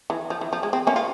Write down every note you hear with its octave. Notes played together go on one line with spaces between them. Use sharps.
E3
F3
E3
F3
G#3
C4
A#3 C#4
F4